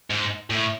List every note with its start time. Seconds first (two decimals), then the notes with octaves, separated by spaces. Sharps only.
0.10 G#2
0.50 A2